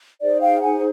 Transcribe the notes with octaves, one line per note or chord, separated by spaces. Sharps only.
D#4 G#4 C5 D5
F5 G5
F#5 G#5